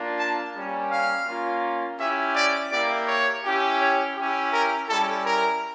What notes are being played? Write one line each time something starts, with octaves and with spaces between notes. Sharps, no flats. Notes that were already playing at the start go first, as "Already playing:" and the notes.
Already playing: A#3 D4 F4
A5
G3 A#3 C#4
F5
A#3 C#4 F4
C#4 E4 G4 E5
D5
A#3 E4 G4 D5
C#5
C#4 E4 G4
C#5
C#4 E4 G4
A#4
G3 C#4 E4 A4
A#4